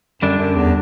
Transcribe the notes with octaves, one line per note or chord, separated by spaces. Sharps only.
F#2 D3 G3 D4
F#2
E2